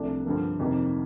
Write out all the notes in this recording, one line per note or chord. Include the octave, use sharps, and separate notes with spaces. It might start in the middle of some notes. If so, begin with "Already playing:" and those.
Already playing: C2 C3 F3 A3 D4
G2 D3 F3 A#3
F2 C3 D#3 A#3